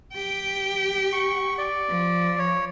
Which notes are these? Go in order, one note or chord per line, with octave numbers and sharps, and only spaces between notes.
G4 G5
C#6
D5
F3
C#5